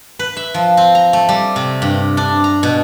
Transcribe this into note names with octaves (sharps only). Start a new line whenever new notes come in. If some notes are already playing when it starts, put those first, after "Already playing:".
B4
E5
F3
C4
A#5
A3
G3
C3
G2
D4
A#5
B2